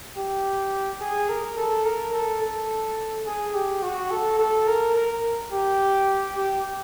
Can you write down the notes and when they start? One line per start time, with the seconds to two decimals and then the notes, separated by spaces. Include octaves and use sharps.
0.16 G4
1.00 G#4
1.29 A#4
1.58 A4
1.85 A#4
2.13 A4
2.42 A4
3.26 G#4
3.54 G4
3.82 F#4
4.11 A4
4.39 A4
4.67 A#4
4.96 A#4
5.52 G4
6.35 G4